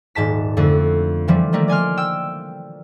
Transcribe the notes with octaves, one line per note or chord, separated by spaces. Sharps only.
D#1 G#2 A5 B6
F2 D3 A3
E3 F3 G3 A3
D#3 G3 A3 A#3
D5 G#5 C6 F6
G5 E6 E7